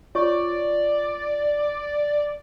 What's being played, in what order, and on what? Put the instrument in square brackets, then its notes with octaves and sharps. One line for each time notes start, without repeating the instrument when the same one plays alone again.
[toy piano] F4 C#5 C#6 [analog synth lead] D5